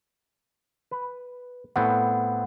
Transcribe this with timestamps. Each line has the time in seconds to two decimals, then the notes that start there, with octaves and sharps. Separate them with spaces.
0.91 B4
1.76 A2 B3 C4 F#5